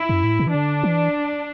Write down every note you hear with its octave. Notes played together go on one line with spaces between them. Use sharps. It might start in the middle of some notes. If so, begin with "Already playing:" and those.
Already playing: E4
F#2
A2
B2
E3
D3 D4
E3